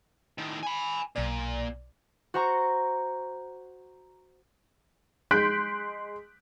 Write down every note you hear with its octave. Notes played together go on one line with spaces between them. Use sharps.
A2 D#3
G#5 B5
B1 A#2 D5
F#4 C5 A#5 C#6
G#3 C6 F#6 G6 B6 D7